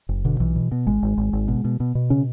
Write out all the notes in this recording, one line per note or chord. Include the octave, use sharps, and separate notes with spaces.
F#1
B2 D3
B1 E3
B2
B2
G#1 G#3
G#1
G#1
G#1
B2
B2
B2
B2
C#3 C#4